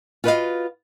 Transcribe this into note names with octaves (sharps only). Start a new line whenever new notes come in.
F4 F#4 B4 C#5 D#5 F5